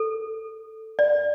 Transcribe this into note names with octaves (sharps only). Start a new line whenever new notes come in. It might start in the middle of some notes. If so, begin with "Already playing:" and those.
Already playing: A4
D5